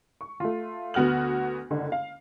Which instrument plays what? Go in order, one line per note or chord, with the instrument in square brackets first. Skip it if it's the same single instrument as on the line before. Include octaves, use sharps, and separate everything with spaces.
[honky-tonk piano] C#6
A3 F4
D2 B3 F#4 F6 F#7
F#1 D3
F5